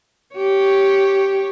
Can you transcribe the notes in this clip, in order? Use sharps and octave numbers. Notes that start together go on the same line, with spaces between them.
G4 C#5